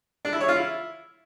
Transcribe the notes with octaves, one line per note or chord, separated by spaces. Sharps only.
D4
E4
C#5
F4
E4